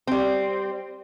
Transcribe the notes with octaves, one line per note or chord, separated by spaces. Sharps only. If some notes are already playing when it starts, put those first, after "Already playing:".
G3 C4